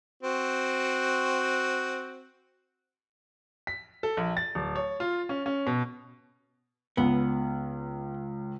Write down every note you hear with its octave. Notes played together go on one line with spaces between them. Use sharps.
C4 F#4
B6
A4
A#1
A6
D1
C#5
F4
C#4
C#4
B2
C#2 B3